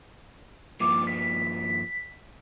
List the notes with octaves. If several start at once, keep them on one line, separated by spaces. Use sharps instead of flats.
G2 F3 A#3 D6
B6